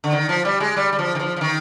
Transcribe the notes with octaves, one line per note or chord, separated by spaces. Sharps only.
D3
D#3
F3
G3
G#3
G3
G3
F3
D#3
F3
F3
D#3